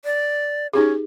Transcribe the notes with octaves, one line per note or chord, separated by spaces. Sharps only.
D5
C#4 D#4 G4 G#4